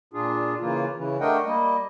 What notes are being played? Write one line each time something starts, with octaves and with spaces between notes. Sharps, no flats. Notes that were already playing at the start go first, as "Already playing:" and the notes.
A#2 D4 F4 G#4
C#3 E3 A#3 F4
C#3 E3
A3 D4 A#4 D#5 F#5 G5
G3 A#3 D#5